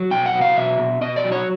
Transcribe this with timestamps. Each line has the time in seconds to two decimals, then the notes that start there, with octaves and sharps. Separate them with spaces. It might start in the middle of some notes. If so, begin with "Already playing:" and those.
Already playing: F#3
0.11 B2 G5
0.26 F#5
0.33 F#3
0.41 F5
0.56 B2 E5
0.79 B2
1.01 B2 D#5
1.16 D5
1.24 F#3
1.32 C#5